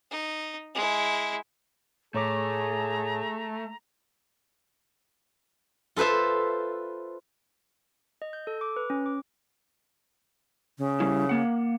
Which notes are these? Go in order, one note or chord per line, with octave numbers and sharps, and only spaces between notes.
D#4
G#3 E4
A2 A3 G#4 C#5 A#5 D6
F4 A4 B4 C5 E5
D#5
G6
A4
D6
B4
C#4
D6
C#3
G3 E4
A#3 F#5